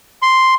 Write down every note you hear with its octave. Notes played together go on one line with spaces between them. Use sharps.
C6